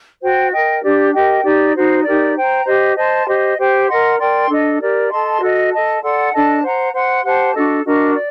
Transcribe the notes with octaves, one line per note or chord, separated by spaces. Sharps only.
F#4 C5 G5
A#4 D#5 G5
D4 G4 D5
G4 A#4 D#5 G5
D#4 G4 D5
D#4 F#4 C5
D#4 G4 A#4 D5
C5 G5 A#5
G4 C5 D#5
C5 D#5 A5 C6
G4 C5 D#5
G4 C5 G5
A#4 D#5 F#5 C6
A#4 D5 G5 C6
D4 A4 D#5
G4 A#4 D5
A4 D#5 A5 C6
F#4 A4 D#5
A4 D#5 A5
A4 D5 F#5 C6
D4 A4 D#5 A5
C5 F#5 A#5
C5 F#5 C6
G4 C5 F#5 A5
D4 F#4 A4 D#5
D4 F#4 A#4 D#5
D5